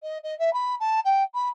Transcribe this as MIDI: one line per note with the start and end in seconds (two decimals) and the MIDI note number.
0.03 0.18 75
0.24 0.37 75
0.39 0.53 76
0.53 0.75 83
0.80 1.00 81
1.05 1.23 79
1.34 1.49 83